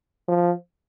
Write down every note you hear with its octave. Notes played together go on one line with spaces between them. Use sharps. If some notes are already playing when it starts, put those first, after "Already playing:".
F3